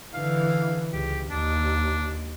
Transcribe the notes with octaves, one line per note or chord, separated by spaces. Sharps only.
D3 E3 F5
C#2 G4
D#2 D4